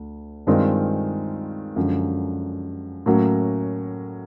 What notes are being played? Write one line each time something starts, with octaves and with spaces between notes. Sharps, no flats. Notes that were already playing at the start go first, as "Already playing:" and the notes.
Already playing: D2
G2 D#3 G#3 C4 F4
F#2 D3 F3 G#3
A2 F#3 A#3 C#4